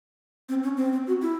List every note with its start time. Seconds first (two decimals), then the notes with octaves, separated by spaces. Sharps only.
0.49 C4
0.63 C#4
0.77 C4
0.92 C4
1.07 F#4
1.22 E4